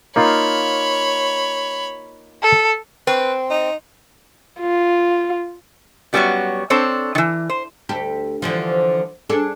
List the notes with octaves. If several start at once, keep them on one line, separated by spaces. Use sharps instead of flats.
A#3 D#4 F4 C#5 B5
A4
C4 B4
D#4
F4
F#2 G3 A3 B3 F#4 C#5
C4 D4 A4 C5 C#5
D#3 E3
C5
D2 G4 A4
D3 E3 F3
D4 G#4 A4